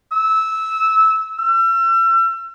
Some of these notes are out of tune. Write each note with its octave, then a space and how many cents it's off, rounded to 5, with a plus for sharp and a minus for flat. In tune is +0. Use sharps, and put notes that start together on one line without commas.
E6 -15
E6 +40